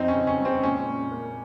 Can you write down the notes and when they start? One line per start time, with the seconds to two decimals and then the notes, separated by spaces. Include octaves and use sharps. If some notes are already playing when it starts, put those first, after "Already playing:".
Already playing: F2 C4 D#4
0.08 C#4
0.15 C#3
0.27 C#4
0.39 G#3
0.45 C4
0.63 A#2 C#4
0.88 A#2
1.12 A#3